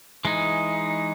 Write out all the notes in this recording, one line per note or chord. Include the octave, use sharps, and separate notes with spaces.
E3 G#3 D#4